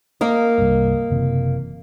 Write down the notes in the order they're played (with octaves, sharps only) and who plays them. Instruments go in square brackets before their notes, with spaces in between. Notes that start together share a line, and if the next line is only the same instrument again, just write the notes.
[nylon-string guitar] A#3 A#4 D#5
[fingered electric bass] C2 G2
F#1 C3 E3